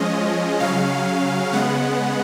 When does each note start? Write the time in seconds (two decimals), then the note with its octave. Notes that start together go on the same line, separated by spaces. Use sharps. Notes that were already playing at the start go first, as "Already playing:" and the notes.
Already playing: F3 G#3 C#4 D#5
0.60 C#3 F#3 C#4 F5
1.53 C#3 G#3 B3 F#5